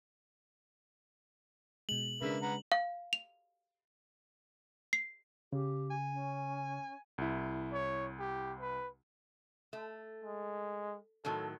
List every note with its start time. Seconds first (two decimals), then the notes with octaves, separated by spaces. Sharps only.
1.89 B2 G#3 F#7
2.22 C#3 G#3 A#3 D4 B4 E5
2.42 B4 F#5 A#5
2.72 F5
3.13 F7
4.93 C7
5.53 C#3 G4
5.91 G#5
6.12 C#4
7.18 C2 E4
7.73 C#5
8.19 G4
8.60 B4
9.73 A3
10.24 G#3
11.25 A2 D#3 F#3 A4